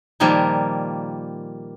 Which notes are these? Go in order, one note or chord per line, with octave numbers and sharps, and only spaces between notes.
A#2 D#3 F3 G3 A#3